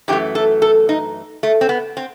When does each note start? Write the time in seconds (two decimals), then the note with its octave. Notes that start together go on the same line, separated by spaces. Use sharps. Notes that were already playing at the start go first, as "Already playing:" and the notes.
0.08 F#2 E3 A3 G4
0.35 A4
0.62 A4
0.89 D#4
1.43 A3
1.61 C4
1.69 B3
1.97 C4